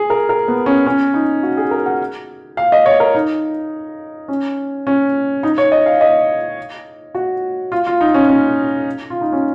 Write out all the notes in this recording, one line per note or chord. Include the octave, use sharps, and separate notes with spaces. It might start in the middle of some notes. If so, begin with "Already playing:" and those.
Already playing: G#4
A#4
A#4
B3
C#4
C#4
D#4
F#4
G#4
A#4
F#5
F5
D#5
C#5
A#4
D#4
C#4
C#4
D#4
C#5
D#5
F5
D#5
F#4
F4
F4
D#4
C#4
C#4
F4
D#4
C#4